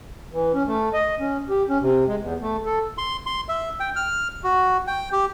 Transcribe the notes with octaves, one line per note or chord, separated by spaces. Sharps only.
E3
C#4
A3
D#5
C#4
G4
C#4
C3
G#3
E2
A3
A4
C6
C6
E5
G5
F6
F#4
G5
G4